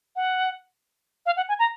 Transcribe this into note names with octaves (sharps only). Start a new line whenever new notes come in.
F#5
F5
F#5
G#5
A#5